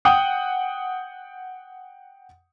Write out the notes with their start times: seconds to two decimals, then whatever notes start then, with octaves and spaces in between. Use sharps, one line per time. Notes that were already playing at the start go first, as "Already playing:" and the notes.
0.05 F#5 G5 D#6